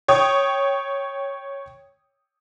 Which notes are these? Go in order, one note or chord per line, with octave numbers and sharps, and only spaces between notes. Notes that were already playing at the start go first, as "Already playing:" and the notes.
C#5 G5 D#6